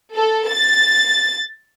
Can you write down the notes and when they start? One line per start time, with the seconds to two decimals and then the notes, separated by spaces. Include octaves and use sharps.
0.14 A4
0.49 A6